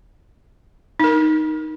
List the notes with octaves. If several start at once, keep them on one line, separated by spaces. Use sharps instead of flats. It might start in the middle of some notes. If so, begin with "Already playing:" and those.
D#4 A#4